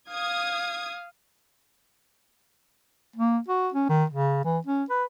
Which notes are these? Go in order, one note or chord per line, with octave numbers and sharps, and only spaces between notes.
F5 D#6 G#6
A#3
F#4
C#4
D#3
C#3
E3
C#4
B4